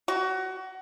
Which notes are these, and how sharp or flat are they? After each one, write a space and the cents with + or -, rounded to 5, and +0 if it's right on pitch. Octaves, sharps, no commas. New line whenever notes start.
F#4 +25